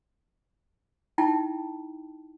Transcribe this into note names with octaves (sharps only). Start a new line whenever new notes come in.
D#4 E4 G5 A5